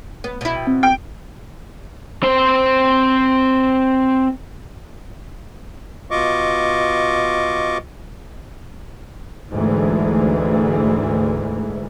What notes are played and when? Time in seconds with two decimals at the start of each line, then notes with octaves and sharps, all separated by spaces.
0.24 B3
0.41 B2 E4
0.55 G5
0.67 C4
0.83 G5
2.23 C4 C5
6.11 B2 F4 D#5 C#6 D6
9.51 D2 G#2 E3